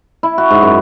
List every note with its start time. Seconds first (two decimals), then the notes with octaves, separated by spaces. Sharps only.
0.23 E4
0.38 F#4
0.51 G#2
0.63 F#2